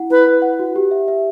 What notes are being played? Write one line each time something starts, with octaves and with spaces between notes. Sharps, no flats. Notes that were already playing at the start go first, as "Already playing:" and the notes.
Already playing: E4 F#5
E4 B4
B4
F#5
F#4
G4
E5
E5